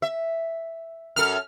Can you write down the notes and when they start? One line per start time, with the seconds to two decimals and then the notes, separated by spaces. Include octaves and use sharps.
0.02 E5
1.16 F#2 A4 F6